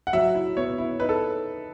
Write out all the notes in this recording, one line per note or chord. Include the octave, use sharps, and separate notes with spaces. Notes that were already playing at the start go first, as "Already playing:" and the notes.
F#5
F#3 E5
E4
B3 C#5
E4
D#4 B4
A4